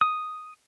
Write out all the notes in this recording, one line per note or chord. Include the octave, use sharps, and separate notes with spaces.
D#6